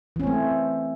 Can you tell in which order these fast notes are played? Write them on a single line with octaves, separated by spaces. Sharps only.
E3 C#4 C4 A3